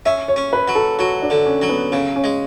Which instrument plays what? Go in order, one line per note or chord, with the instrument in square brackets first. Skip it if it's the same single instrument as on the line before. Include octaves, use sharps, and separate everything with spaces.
[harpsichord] C#4 [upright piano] E5
[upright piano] C#5
[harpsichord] C#4
[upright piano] B4
[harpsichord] F#3
[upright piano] A4
[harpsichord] F#3 [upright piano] F#4
[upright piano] D4
[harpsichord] D3
[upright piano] C#4
[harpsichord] F#3
[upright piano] B3
[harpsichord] C#3 [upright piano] C#4
[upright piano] C#4
[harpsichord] G#3